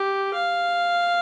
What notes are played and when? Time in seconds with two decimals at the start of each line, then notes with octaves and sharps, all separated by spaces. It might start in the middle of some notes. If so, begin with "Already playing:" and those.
Already playing: G4
0.33 F5